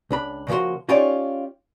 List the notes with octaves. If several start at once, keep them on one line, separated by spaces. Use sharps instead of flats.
C#2 D4 B5
C#3 F3 A#3 F#4 C6
C#4 D#4 F4 G4 C#5 D5